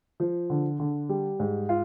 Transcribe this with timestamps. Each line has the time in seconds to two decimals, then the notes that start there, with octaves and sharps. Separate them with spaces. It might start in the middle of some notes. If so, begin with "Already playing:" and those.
0.20 F3
0.50 D3
0.80 D3
1.09 G3
1.40 G#2
1.69 F4